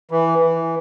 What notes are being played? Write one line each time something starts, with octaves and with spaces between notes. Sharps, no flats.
E3
E3